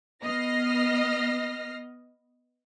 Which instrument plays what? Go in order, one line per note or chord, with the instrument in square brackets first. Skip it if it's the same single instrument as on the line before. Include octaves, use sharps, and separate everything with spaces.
[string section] B3 D#5 F6 A#6 C7